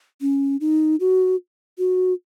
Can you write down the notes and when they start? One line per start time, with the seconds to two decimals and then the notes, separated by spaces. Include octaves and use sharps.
0.21 C#4
0.61 D#4
1.00 F#4
1.78 F#4